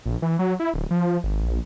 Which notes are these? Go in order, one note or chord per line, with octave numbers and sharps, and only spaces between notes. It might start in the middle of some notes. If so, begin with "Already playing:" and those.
A#1
E3
F#3
E4
D1
F3
F3
G#1
A#1